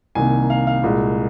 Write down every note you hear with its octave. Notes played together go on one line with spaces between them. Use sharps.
C2 C3 D#3 A#3 G#5
F5
F5
C2 A#2 G#3